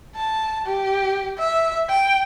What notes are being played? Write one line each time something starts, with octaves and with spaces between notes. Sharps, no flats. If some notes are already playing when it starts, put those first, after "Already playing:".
A5
G4
E5
G5